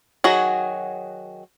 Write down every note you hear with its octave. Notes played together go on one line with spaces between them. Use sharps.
D#3 F#3 F#4 G#4